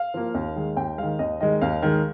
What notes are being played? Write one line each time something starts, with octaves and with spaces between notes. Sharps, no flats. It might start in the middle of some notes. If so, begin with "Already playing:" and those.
Already playing: F5
F3 A#3
D#2
D#3 G#3
D#2 G5
D#3 G#3 F5
D#2 D#5
D#3 G#3 D#5
D#2 F5
D#3 G#3